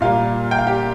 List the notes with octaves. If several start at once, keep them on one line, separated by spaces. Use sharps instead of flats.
A#2 G3 A#3 F4 F5
G5
F5
G4 G5